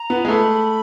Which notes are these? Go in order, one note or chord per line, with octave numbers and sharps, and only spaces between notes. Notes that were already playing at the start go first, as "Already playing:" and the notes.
Already playing: A#5
B3
G#3
A3 B5